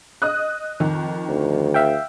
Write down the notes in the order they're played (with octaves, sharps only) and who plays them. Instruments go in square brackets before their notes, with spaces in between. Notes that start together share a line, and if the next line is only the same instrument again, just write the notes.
[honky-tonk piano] D#5 D#6 F#6
F2 D#3
[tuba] D2
[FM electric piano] E5 F5 G5